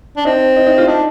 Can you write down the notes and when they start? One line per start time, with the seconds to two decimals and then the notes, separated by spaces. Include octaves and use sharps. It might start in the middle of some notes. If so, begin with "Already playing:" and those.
0.17 D4
0.25 C4 D#4
0.57 D#4
0.67 D#4
0.78 F4
0.87 D4 D#4